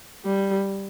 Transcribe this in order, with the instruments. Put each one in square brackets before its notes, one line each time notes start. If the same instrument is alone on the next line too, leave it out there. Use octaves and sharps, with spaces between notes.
[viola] G3